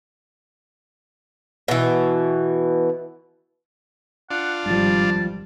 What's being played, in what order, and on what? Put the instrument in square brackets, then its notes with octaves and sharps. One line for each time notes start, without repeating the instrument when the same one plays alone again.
[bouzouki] B2 E3
[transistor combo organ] D4 F4 [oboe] F#5
[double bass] G#1 G3 [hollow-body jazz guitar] G2 F3 [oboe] A5